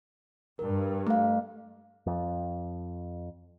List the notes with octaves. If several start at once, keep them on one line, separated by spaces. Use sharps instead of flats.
G2 A#4
A3 F5
F2